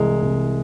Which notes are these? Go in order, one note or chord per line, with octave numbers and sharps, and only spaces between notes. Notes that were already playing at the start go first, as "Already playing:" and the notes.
Already playing: C2 C3 E3 G#3
C2